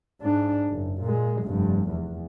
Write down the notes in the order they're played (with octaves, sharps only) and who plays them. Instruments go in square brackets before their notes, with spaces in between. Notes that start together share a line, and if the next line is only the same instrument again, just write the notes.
[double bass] G#2 D4
F#1
A#2 G#3
F1 G2
E2